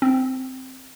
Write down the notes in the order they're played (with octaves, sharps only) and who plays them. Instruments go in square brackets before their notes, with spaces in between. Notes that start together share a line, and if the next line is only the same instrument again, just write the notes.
[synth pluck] C4